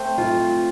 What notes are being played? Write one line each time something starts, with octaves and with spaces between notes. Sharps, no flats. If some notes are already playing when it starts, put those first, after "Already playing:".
Already playing: A3 C4
F4